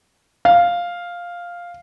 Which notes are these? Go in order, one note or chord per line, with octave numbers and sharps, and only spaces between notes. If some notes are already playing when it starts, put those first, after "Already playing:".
F5